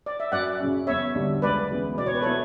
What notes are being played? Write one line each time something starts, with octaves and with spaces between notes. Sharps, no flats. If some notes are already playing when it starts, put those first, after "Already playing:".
D5
E5
F#2 D5 F#5
C#3 F#3 C#4
E2 C#5 E5
D3 G3 D4
C#2 B4 D5
C#3 E3 B3
B2 D5
C#5
B4
F#3 B3 E4 A4 C#5